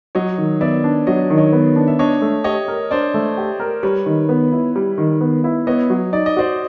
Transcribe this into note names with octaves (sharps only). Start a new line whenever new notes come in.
F#3 C#5 D#5
D#3
B3 D5 E5
D4
F#3 C#5 D#5
D#3
C#5 D#5
B3
D4
E5
D4 C#5 D#5
A3
G4 C#5 D#5
A#4
D4 C5 D5
A3
G4
A#4
G3 B4 C#5
D#3
B3
E4
G3
D#3
B3
E4
B3 C#5 D#5
F#3
D#4 D5
D#5
F#4 C5 D5